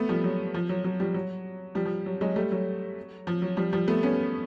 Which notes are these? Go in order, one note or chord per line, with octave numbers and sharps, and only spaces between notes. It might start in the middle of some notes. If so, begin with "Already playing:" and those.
Already playing: A3 B3
F3 G3
F#3
F3
F#3
F#3
F3 G3
F#3
F3 G3
F3
F#3
F#3 G#3
G3 A3
F#3
F3
F#3
F3 G3
F3 G3
A3 B3
B3 C#4